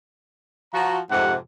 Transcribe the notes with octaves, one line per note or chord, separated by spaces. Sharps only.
F3 F#4 A#5
F2 G#2 C3 F#5